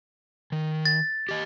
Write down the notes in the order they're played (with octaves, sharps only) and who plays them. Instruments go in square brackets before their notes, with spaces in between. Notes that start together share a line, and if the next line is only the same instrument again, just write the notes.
[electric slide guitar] D#3
[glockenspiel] A6
[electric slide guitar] G4 D#5